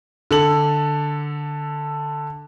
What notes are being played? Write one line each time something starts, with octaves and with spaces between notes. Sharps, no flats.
D3 A4 F#7